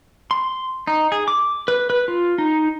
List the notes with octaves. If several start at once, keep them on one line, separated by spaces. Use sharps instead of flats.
C6
D#4
G#4
D6
B4
B4
F4
D#4